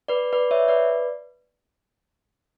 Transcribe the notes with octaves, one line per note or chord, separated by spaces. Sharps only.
B4 D5
B4 D5
C#5 E5
B4 D5